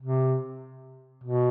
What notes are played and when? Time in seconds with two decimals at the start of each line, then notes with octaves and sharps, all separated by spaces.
0.01 C3
1.24 B2